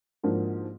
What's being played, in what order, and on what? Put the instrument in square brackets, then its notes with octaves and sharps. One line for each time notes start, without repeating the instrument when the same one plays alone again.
[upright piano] G#2 F3 A#3 D4 F#4